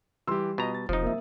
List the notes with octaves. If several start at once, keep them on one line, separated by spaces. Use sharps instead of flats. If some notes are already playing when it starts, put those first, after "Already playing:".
E3 G3 G4 C6 E6
B2 F4 D#5 A#5
A6
E1 C3 F3 D#4 D#6
A#3 E5